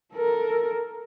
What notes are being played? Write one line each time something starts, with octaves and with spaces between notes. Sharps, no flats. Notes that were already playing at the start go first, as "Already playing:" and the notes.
A4 A#4